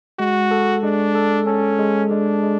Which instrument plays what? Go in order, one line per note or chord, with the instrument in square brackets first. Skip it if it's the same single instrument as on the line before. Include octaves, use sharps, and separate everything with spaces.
[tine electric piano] G#3 [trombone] F#4
[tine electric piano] A4
[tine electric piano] G#3 [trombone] D4
[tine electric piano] A4
[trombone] C#4 [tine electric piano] A4
[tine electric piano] G#3
[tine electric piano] G#3 [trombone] D4
[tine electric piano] G#3